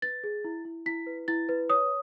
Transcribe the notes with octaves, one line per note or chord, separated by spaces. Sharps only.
B4 A6
G#4
E4
E4
E4 B6
B4
E4 A6
B4
C#5 D#6